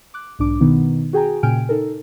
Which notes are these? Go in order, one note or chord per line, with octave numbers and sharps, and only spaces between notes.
D6 F#6
B1 G#2 D4 D6
B2 D#3 B3 D#4
F#4 G#4 G5 G#5 A#5
A#2 C#3 G5 G#5 F6 D7
D#4 A4 A#4